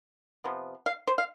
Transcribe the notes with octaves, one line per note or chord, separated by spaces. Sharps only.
C3 F3 B3
F5
C5
F5